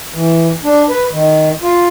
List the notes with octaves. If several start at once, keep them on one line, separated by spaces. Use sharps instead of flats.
E3
D4
B4
D#3
F4